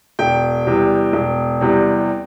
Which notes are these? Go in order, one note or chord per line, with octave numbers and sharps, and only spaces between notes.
E1 G5
E2 C3 G3
E1
E2 C3 G3